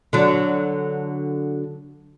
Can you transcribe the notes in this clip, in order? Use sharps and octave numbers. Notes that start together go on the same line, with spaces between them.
D3 F#3